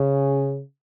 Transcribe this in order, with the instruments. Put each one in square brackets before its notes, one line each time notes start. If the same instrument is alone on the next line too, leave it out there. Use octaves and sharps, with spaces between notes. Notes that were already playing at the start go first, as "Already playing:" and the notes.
Already playing: [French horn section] C#3